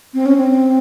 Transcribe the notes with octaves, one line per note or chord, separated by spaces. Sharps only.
C4
C#4
C4